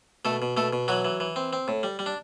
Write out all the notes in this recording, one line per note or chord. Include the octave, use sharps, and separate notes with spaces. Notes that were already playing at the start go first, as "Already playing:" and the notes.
B2 A3 A4
B2
B2 A3 A4
B2
E3 F#3 F#4
E3
E3
C4
C4
A2
G3
G3
D4